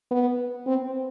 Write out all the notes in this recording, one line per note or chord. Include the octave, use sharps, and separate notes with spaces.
B3
C4